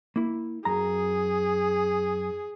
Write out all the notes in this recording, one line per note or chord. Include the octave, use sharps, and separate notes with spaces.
A#3 E4
F#2 G#4 A#5